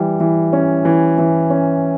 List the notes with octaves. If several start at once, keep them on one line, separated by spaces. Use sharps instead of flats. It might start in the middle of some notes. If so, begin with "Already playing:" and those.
Already playing: E3 G3
E3
C#4
E3
E3
C#4